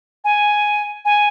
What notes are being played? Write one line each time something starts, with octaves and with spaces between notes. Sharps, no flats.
G#5
G#5